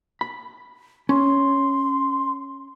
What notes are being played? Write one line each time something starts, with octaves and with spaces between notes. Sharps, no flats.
B5
C#4 C6